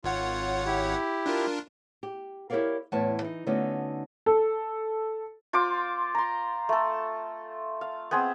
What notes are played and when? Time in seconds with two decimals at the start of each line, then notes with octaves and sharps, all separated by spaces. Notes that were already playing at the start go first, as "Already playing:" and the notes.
0.04 G#1 F4 C#5 F#5
0.66 E4 G4
1.26 D4 F4 A#4
2.03 G4
2.50 E4 G4 A#4 C#5 D5 F5
2.92 E2 A2 E4 B4 C#5 A5
3.21 E3 D#4
3.47 D3 A3 B3 C#4 D#4 F#4
4.26 A4
5.53 F4 C5 C6 D6
6.15 A#5 C6
6.69 A3 A4
7.81 F5
8.11 B3 C4 G#4 C5